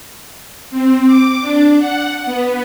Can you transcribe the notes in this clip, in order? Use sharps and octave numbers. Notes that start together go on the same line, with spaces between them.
C4
D6
D4
F#5
B3